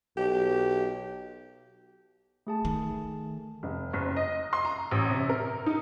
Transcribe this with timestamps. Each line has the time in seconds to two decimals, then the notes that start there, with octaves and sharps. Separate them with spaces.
0.17 B1 G4
2.47 A3 G#4 A5
2.65 D#3
3.63 F1
3.93 F#1
4.16 D#5
4.53 C6
4.65 A#5
4.91 A1
5.10 C3
5.29 A#4
5.66 D#4